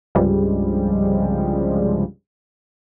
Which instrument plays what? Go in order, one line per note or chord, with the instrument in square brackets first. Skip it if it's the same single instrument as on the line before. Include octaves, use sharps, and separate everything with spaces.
[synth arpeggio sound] C2 G2 C#3 F3 G3 G#3